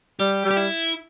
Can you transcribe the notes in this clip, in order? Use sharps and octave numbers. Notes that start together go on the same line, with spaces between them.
G3 G4
G3
G4
E4